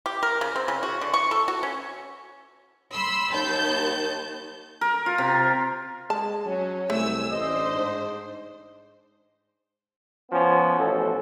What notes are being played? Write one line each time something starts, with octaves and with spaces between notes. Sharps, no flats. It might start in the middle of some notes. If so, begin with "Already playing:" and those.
G4
A#4
C#3
C4
C#3
F#4
D3
C#6
A4
F#4
C#4
B5 C6 E6
D#2 A5 G6
A#4
F4
C3
G#3 A5
F#3 C#4
C2 A3 G#5 E6
A1 D4 C5 D#5
G#2
F3 B3 C#4
A1 B2 A4